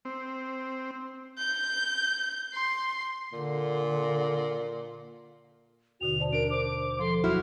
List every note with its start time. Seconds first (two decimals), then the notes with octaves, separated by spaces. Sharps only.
0.05 C4
1.39 G6
2.53 C6
3.33 A#2 D3
6.01 D#2 B2 D3 F#4 F7
6.20 C5 D5 A5
6.33 D4 A#4 D7
6.50 C5 D6
6.99 F3 A4 C6
7.24 D#2 F#3 E4 F#4 F6